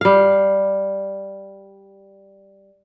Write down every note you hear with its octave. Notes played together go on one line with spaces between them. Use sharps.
G3 F5